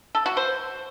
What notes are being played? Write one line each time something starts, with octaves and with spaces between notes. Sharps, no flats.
A4
F#4
C5